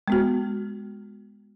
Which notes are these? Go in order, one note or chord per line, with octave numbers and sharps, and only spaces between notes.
G#3 B3 F#4